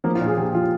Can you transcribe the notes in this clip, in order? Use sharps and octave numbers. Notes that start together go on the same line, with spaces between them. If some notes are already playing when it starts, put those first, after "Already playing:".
F3 A#3
F4
A#2 G#4
F3 G4
F3 F4